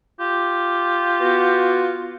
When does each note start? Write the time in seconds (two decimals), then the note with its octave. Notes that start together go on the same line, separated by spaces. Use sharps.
0.20 F4 G4
1.20 B3 F#4